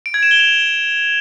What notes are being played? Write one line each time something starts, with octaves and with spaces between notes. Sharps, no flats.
D7
G#6
E7
G7
F7